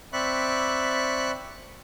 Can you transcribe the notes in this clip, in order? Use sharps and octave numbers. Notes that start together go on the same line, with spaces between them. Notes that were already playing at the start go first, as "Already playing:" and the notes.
C4 D5 E5 B5 C#6 F#6